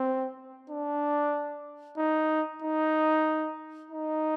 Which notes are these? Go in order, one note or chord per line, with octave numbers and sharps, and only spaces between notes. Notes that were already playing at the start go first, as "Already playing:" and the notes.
Already playing: C4
D4
D#4
D#4
D#4